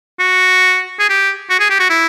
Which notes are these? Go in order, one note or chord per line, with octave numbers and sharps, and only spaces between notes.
F#4
G#4
G4
F#4
G#4
G4
F#4
E4